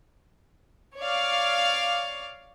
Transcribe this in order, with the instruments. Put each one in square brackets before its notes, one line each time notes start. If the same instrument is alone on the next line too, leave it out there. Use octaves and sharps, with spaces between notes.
[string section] C#5 D5 F5